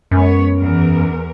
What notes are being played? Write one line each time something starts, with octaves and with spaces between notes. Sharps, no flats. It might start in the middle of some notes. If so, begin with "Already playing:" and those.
F#2 G#3 B3 C#5
E2 A#4